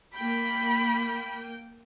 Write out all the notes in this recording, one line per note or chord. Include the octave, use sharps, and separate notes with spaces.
A#3 G5 B5